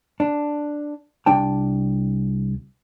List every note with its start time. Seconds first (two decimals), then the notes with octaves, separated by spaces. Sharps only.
0.20 D4
1.26 C2 D4 G5 A5